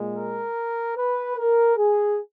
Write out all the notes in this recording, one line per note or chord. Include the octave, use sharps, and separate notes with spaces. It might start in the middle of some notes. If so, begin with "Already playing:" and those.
Already playing: A#2 G#3
A#4
B4
A#4
G#4